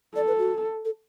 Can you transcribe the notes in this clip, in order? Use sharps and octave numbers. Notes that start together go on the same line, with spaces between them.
A4 D5
B4
F#4
A4